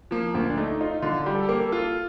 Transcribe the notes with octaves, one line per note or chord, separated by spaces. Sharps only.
F3 A#3
D2 A#3
D4
A3 D#4
D#4 F4
D3 F4
G3
A4
G4
A#3
A4
F4
A4